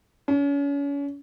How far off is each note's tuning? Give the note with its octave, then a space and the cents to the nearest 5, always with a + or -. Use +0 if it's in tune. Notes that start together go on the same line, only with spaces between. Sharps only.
C#4 +35